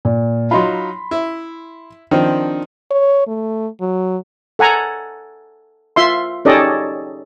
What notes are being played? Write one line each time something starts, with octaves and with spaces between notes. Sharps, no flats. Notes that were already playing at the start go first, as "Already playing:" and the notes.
A#2
F#3 D#4 F4 B5 C6
E4
D#3 F3 C4 D4
C#5
A3
F#3
A4 F#5 G#5 A#5
F4 E5 C6
C#4 D#4 G4 A4 D5 D#5